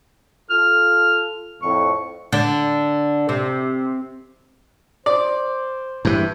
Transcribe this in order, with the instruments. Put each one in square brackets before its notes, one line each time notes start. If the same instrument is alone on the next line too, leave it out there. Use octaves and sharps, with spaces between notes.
[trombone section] F4 A4 [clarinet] F6
[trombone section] F2 A2 [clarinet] C#6
[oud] D3 D4
C3
[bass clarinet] C5 [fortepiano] D5
[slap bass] G2 E3